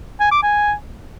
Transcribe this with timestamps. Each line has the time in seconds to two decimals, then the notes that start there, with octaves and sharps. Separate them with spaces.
0.20 G#5
0.31 D6
0.43 G#5